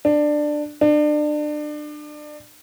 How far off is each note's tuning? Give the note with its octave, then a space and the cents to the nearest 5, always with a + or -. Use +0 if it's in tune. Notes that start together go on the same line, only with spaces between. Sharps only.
D4 +15
D4 +30